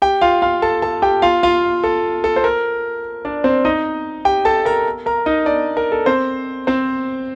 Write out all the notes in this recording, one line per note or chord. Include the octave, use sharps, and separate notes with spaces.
G4 G5
F4 F5
F4 F5
A4 A5
A4 A5
G4 G5
F4 F5
F4 F5
A4
A4
C5
A#4
D4 D5
C4 C5
D#4 D#5
G4 G5
A4 A5
A#4 A#5
A#4 A#5
D#4 D#5
D4 D5
A#4
A4
C4 C5
C4 C5